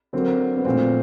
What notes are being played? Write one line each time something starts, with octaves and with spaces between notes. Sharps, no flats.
D3 F#3 A#3 C4
B3
A#2 F3 A3 C4